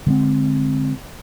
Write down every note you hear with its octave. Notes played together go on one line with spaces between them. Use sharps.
D3 G#3 C4